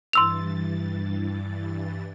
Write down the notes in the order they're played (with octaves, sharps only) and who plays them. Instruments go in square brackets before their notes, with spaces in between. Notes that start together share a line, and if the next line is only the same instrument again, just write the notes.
[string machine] G2 E3 A6 [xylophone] C6 E6 F7